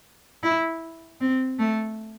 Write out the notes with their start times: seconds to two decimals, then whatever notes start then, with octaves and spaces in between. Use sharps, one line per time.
0.43 E4
1.21 C4
1.59 A3